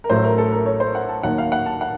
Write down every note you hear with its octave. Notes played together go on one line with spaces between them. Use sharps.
A#4
A1 A2 F#3 A3 C5
A#4
A4
A#4
C#5
C5
F#5
A5
D#2 D#3 F#3 F#5
F5
F#5
A5
F#5